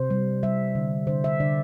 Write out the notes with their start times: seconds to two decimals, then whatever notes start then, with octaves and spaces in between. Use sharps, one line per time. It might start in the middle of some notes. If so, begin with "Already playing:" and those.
Already playing: C3 C5
0.10 G3
0.43 G3 E5
0.75 D3
1.07 D3 C5
1.24 E5
1.40 D3 D5